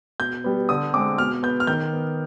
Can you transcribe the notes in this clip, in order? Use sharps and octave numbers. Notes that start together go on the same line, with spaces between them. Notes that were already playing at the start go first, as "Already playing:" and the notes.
B2 G6
G3 B3
D3 D#6
G#3 C4 D6
B2 F6
B3 G6
F6
D#3 G6
B3